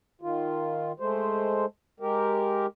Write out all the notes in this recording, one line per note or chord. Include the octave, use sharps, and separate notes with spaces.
D#3 F4
G#3 A3 C5
G#3 G4 A#4